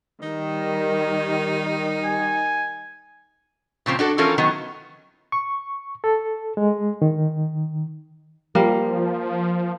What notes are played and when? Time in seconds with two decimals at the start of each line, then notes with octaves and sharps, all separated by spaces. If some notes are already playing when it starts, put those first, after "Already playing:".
0.23 D#3 G3 D#4
2.06 G#5
3.86 A#2 C#3 F3 C4
3.99 D4 F#4 A4
4.18 E3 F3 C#4 F4 A4 A#4
4.38 D#3 F#3 B3
5.32 C#6
6.04 A4
6.57 G#3
7.02 D#3
8.55 F3 G3 A#3